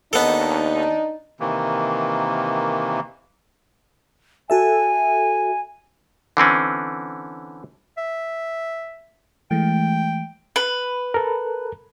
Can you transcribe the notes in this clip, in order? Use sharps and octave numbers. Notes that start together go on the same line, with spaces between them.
D#2 B3 D4 D#4 A4
C3 D#3 E3 A#3
F#4 A4 E5 G#5
D3 E3 C4 C#4
E5
E3 G#3 A3 G5
B4
A4 A#4